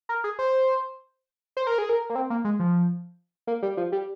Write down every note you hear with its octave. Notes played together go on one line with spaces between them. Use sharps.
A#4
G#4
C5
C5
A#4
G#4
A#4
A#3
C4
A#3
G#3
F3
A#3
G3
F3
G3